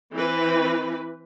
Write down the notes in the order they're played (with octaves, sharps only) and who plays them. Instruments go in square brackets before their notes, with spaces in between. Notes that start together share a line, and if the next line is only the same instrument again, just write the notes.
[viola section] E3 C4 B4